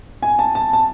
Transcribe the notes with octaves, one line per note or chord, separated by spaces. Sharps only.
G#5
A5
A5
A5